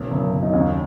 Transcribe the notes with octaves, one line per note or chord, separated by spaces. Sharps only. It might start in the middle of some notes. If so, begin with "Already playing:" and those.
Already playing: F#1 B1
F#1
F#1
D#4
D#2 C#4